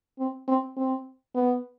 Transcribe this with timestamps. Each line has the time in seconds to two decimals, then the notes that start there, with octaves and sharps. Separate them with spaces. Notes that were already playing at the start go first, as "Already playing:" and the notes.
0.19 C4
0.48 C4
0.76 C4
1.35 B3